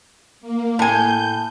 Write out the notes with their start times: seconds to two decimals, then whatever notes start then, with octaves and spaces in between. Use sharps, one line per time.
0.41 A#3
0.79 A2 G#5 G6